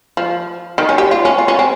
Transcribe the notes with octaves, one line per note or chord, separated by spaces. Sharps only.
F3
D#3
C#4
G4
F4
C#4
F4
C#4
C4